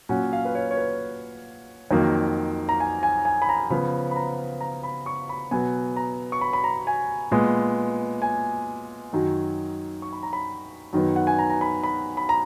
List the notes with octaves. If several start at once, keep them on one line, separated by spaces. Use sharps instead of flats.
A#2 F#3 C#4 F#5
F5
B4
C#5
C#5
B4
F2 D#3 F#3 A#3
A#5
G#5
G#5
G#5
B5
A#5
C#3 F3 B3 B5
B5
A#5
A#5
B5
C#6
B5
B2 F#3 B3 G#5
A#5
C#6
B5
B5
A#5
G#5
A#2 G#3 B3
G#5
F#2 D#3 F#3
C#6
B5
A#5
B5
F#2 D#3 F#3 B3
F#5
G#5
A#5
A#5
B5
B5
B5
A#5